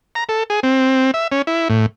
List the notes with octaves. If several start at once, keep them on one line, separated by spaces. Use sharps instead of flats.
A#5
A4
G#4
C4
E5
C#4
E4
A2